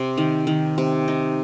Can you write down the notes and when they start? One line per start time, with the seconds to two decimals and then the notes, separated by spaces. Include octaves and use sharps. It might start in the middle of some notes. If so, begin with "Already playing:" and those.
Already playing: C3
0.17 D#3
0.47 D#3
0.78 C3
1.08 D#4